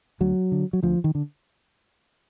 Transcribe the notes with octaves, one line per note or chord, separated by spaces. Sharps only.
D2 F#3
D3
F#3
D2 F3
D#3
D3